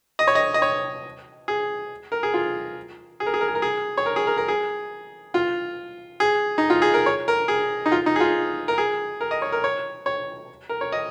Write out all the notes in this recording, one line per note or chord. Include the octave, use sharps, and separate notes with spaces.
D#5
C#5
D#5
D#5
C#5
G#4
A#4
G#4
F4
G#4
A#4
G#4
A#4
G#4
A#4
G#4
C#5
A#4
G#4
A#4
A#4
G#4
F4
G#4
D#4
F4
G#4
A#4
C#5
A#4
G#4
D#4
F4
D#4
G#4
F4
A#4
G#4
A#4
D#5
C#5
A#4
C#5
C#5
A#4
C#5
D#5